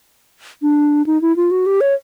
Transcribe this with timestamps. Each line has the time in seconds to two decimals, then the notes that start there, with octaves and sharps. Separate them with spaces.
0.62 D4
1.06 D#4
1.22 E4
1.36 F4
1.51 F#4
1.66 G4
1.81 C#5